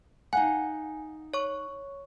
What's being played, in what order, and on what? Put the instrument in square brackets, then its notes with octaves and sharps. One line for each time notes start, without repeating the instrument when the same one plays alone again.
[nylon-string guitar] D#4 F5 F#5 [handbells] G#5
[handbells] C#5 C#6